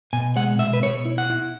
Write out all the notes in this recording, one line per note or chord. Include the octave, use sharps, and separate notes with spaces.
B2 G#5
G#3 F#5
B2 E5
B4
B2 C#5
E4
F#5
E4